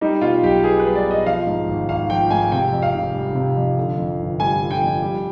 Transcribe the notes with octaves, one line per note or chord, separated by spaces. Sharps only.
G3 D#4
B2 F4
B1 G4
B3 G#4
G3 B4
D5
B2
D#5
F3 F5
G#2
G#1
G#1 F5
F3 G5
G#2 G#5
C3 G5
F2
F5
F1
G3
C3
F2
D3
F2
G1
G3 G#5
D3
G5
F2
G3